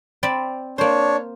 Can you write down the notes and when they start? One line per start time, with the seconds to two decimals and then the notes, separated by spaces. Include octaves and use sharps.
0.23 C4 D5 B5
0.78 A#3 D4 C5 C#5